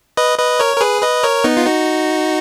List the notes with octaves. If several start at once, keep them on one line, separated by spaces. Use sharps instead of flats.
B4 D#5
B4 D#5
A#4 C#5
A#4
G#4 B4
B4 D#5
A#4 C#5
B3 D#4
F4
D#4 F#4